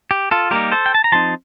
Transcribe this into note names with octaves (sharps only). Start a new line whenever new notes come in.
G4
F4 A4
G3 A#3 D#4 G4 A#4
A4 C5
G5
A5
A#5
F3 C4 D#4 A5 C6